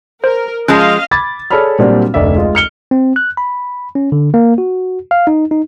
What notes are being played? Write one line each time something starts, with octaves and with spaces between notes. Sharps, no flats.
A#4 C5
F3 G#3 C#4 D#5 F5 F#6
B5 D6 G#6 A6
G#4 A4 C#5 D5 B5 F6
A#2 F#3 G3 C4 D4 F#4
F1 D2 D5 E5
G#3 F4 D#5
F6 C#7 G7
C4
F#6
B5
C#4
D3
A#3
F#4
F5
D#4
D#4